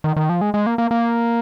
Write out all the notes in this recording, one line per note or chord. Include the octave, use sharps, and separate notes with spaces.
D#3
D#3
F3
G#3
G#3
A#3
A#3
A#3